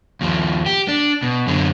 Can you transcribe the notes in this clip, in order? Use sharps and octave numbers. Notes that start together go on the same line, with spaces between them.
D#2 F3
G4
D4
B2
F#2 D3